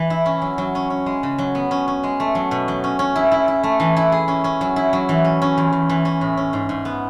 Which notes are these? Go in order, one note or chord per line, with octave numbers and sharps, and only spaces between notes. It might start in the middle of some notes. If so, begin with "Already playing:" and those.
Already playing: E3
E4
C#4
F#3
F#3
C#4
C#4
G#3
C#3
F#3
B3
C#4
C#4
G#3
A3
F#3
B2
F#3
C#4
C#4
E4
E4
E4
A3
E3
E4
G#4
C#4
C#4
F#3
E4
F#3
E3
C#4
C#4
E2
E2
E3
C#4
A2
C#4
G#2
G#2
B3